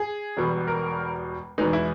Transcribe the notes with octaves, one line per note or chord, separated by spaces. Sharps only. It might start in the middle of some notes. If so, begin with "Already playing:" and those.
Already playing: G#4
E1 E2 B2 G3
A#4
E2 B2 G#3 B3 D#4
E4